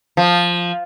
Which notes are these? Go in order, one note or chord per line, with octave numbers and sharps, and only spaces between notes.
F3